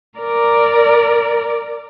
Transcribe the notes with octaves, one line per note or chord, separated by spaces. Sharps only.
A#4 D5